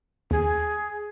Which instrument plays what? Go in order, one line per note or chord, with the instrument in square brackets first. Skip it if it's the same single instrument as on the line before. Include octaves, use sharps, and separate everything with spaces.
[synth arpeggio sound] D#2 [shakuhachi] G#4